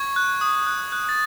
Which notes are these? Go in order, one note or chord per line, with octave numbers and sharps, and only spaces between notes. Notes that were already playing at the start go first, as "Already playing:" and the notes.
Already playing: C#6 G#6
F#6
D#6
F#6
F#6
A6